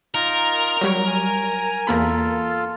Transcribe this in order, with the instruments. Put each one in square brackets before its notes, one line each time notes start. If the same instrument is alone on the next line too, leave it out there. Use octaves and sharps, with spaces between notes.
[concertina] D#4 F4 A#5 [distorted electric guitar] A#4
[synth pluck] F#3 G3 C#5
[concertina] G#5
[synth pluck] E2 A#3 B5 [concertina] F4 A4